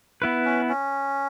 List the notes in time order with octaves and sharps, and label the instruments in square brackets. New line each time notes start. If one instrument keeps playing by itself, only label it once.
[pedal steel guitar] B3 E4 B4
[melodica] C#4
C#4